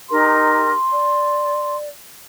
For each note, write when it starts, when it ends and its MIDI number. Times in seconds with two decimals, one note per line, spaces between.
0.09 0.71 63
0.09 0.71 67
0.09 0.71 70
0.09 1.77 84
0.90 1.87 74